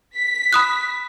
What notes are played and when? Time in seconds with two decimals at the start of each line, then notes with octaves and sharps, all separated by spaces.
0.17 B6
0.53 B5 D#6 F#6